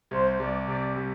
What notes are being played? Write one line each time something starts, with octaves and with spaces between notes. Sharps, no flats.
C2 C5
C2 D5
C3 D5
G3